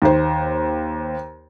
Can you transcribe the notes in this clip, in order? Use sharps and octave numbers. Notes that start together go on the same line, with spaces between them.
D#2 C5